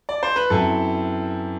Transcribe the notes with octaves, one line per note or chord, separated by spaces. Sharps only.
D5
C5
B4
F#2 F#3 C4 E4 A4